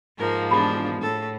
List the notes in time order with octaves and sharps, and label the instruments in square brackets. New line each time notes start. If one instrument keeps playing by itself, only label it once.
[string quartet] G#2 F3 A#3 [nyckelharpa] A#4
[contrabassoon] E1 [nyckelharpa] D4 G#4 [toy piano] F4 G4 B5
[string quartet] A2 [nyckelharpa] A4